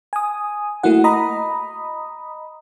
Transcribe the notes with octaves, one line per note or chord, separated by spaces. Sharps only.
G#5 D#6
A3 A#3 E4 F#4 F#5
D#5 A#5 B5 D#6